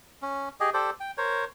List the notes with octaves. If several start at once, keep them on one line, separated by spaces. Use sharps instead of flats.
C#4
G4 G#4 D#5
G4 A4 C5 D5
G5
A#4 C5 C#5